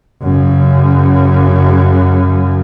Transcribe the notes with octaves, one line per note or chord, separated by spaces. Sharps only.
F#2 C#3